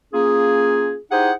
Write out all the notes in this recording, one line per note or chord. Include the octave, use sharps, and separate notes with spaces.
A#3 C#4 F4 G#4
D#4 E4 G4 G#4 C5 F#5